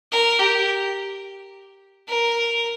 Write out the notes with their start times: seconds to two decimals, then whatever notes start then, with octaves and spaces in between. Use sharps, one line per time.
0.12 A#4
0.40 G4
2.08 A#4